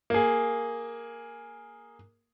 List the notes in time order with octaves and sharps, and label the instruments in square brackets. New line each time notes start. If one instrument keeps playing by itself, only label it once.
[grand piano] A#3 G#4